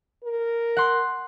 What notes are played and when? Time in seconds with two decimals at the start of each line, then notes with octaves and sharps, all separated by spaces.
0.24 A#4
0.77 F#5 C6